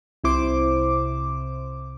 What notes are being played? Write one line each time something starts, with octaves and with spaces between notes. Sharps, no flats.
C2 C3 E4 C5 D6